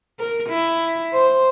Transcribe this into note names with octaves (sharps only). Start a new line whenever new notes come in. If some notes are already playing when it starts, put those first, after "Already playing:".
A#4
E4
C5